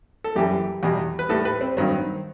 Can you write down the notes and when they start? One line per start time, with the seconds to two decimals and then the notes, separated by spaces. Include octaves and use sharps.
0.24 A4
0.36 F#2 E3 G3 G4
0.83 E2 B2 G3
1.19 B4
1.29 A2 G3 A4
1.45 B4
1.61 C4
1.77 G2 D#3 F#3 C4